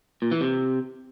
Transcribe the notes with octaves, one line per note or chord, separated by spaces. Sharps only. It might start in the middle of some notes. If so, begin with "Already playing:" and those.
A#2
E3
C3